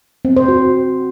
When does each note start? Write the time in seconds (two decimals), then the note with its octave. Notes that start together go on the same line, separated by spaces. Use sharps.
0.25 C4
0.36 C5
0.48 F#4